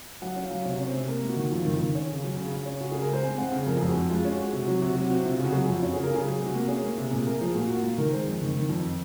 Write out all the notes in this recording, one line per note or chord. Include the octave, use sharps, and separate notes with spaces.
F#3 F#5
C#4
F5
F#3
C3 C#5
C#4
C5
C3
A#3 A#4
A#3
F#4
D#3
F2 F4
D#3
F4
D#3
C#4
C#3
F#3
C#3
C#3
C#4
C#3 F#4
C#3 G#4
A#4
G#3 C5
C4 G#5
C4 F#5
C#3
F2 A#4
F2 G#4
F#4
F2
G#3 F4
C#4
F#4
G#3
C3 F#4
F#3 F#4
C3 F#4
F#3 F#4
C4 F#4
C3 F4
C#3
F#4
F#3 G#4
F#4
F2 F4
C#4 F#4
C#3 G#4
A#4
C#3 G#4
F#3 G#4
C3
F#4
A#3
C#4 G#4
A#3
C3
A#2 G#4
A#3 A#4
F3 G#4
A#2 F#4
A#3 F#4
F4
A#2
D#3 A#4
G#3 C5
F2
D#3
D#3
F2